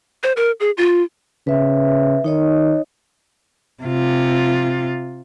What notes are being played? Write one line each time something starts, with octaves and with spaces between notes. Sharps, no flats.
C5
A#4
G#4
F4
C#3 B4 E5
D#3 D#4 C#5 D#5
C3 F4